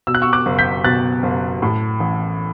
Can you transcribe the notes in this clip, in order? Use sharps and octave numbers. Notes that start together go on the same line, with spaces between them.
B2 E6
F#6
C#6 E6
D6 F#6
F#1
G6 B6
B2 F#6 A6
F#1
A2
A1